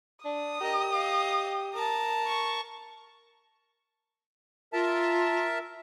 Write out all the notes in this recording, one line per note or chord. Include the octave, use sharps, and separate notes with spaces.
D4 D#6
G4 A#4 D#5
D#5 F5
A#4 A5
C#6
F4 A#4 E5 A5